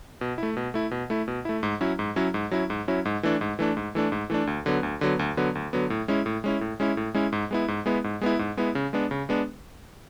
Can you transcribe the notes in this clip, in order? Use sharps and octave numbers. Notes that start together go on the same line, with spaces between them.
B2
A3 E4
B2
A3 E4
B2
A3 E4
B2
A3 E4
G#2
F#3 C#4 E4
G#2
F#3 C#4 E4
G#2
F#3 C#4 E4
G#2
F#3 C#4 E4
G#2
E3 A3 D4
G#2
E3 A3 D4
G#2
E3 A3 D4
G#2
E3 A3 D4
D2
D3 F#3 B3
D2
D3 F#3 B3
D2
D3 F#3 B3
D2
D3 F#3 B3
A2
G#3 C#4 E4
A2
G#3 C#4 E4
A2
G#3 C#4 E4
A2
G#3 C#4 E4
G#2
G#3 B3 E4
G#2
G#3 B3 E4
G#2
G#3 B3 E4
G#2
G#3 B3 E4
C#3
G#3 B3 D4
C#3
G#3 B3 D4